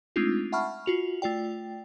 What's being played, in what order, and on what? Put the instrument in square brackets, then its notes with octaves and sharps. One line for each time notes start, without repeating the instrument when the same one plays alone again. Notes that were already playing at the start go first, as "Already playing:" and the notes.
[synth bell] G#3 A3 C4 D4 D#4 F4
E5 F#5 A5 B5 C#6 F6
F4 F#4 F7
A3 F4 D5 G5